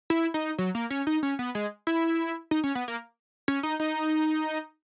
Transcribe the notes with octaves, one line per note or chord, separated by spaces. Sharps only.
E4
D#4
F#3
A#3
C#4
D#4
C#4
B3
G#3
E4
D#4
C#4
B3
A#3
C#4
D#4
D#4